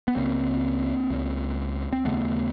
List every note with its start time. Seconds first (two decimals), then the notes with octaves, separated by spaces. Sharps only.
0.08 B3
0.16 C#2 C#3 A#3 C4
1.10 C#2 C#3
1.93 C4
2.05 D#2 C#3 A3 B3